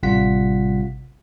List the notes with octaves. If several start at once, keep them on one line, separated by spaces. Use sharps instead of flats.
A1 C3 G3 F4 F#5 B6